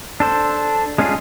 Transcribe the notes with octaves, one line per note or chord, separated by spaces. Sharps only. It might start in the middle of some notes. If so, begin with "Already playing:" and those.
D4 A4 C5
G#3 C#4 D4 F4 G#4